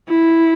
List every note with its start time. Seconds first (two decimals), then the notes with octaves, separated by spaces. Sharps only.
0.09 E4